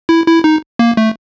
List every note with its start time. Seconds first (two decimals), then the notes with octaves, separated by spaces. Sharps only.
0.09 E4
0.27 E4
0.44 D#4
0.79 A#3
0.97 A3